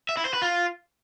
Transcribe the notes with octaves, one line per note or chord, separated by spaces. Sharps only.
E5
E4
C5
B4
F4